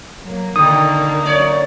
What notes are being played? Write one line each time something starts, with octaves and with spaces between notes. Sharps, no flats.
F#3 A#3
B2 D3 D#3 A#3 D#4 D#6
F#2 C#5 D5